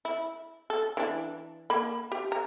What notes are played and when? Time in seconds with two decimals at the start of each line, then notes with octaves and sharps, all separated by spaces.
0.05 E4
0.70 A4
0.97 E3 D4
1.70 A#3 B5
2.12 G4
2.32 A#5